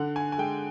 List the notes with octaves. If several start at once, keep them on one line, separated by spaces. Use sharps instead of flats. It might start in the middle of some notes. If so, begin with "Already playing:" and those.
Already playing: D3 F#5
G#5
G#5
G#3 G5